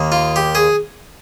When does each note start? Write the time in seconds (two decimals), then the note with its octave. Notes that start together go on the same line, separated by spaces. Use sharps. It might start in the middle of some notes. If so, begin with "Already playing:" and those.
Already playing: D#2 D#3 A#3
0.12 F4
0.36 G4
0.55 G#4